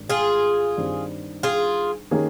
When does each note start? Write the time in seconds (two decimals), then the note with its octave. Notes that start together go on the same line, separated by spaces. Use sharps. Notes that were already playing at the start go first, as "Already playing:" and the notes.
Already playing: G#1 G2
0.09 F4 G#4
0.77 G2 D#3 G3 C4
1.43 F4 G#4
2.11 D#3 A#3 C#4 G#4